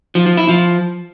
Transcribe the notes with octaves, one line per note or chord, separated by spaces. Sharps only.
F3
F3
E4
F3